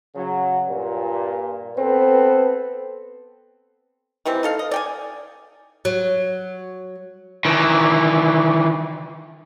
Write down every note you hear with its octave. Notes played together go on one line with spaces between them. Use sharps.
C#3 F#3
G2 A#2
B3 C4 A4 B4
D#3 E3 G3 C4
D#4 A4 F5
D#5
D5 G5 G#5
F#3
D#3 E3